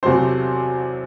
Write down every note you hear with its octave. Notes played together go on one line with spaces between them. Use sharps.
E2 C3 F#3 A3 C4 C5